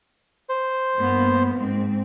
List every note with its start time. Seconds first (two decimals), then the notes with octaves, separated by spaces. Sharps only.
0.49 C5
0.96 G2 A#3 B3
1.56 G#2 C4